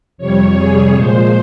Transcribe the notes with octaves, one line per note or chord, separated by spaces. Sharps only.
F2 C3 G3 C#5
G#4
A#2 F3 G#3 C5